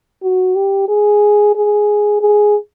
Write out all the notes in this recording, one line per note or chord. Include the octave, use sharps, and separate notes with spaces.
F#4
G4
G#4
G#4
G#4